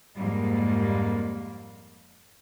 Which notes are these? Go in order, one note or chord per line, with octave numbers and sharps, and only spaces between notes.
F2 G#2 G3 A#3